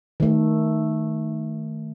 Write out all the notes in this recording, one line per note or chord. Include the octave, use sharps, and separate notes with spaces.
D#3 A3